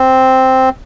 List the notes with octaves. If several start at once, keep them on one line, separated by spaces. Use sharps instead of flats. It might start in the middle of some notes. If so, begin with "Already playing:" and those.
Already playing: C4